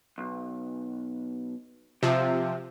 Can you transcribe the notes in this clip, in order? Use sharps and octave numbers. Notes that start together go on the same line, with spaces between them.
B1
C3 F3 G4 E5